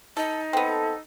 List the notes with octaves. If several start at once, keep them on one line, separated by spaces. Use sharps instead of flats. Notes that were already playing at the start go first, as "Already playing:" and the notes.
D#4 A4
B3 C4 A4 G5